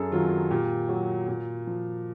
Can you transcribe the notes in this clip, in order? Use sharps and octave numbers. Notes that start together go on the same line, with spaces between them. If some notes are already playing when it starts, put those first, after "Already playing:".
Already playing: F#2 G#4 A4
D#3 F#3 F4
A#2 G4
F#3 F#4
A#2
F3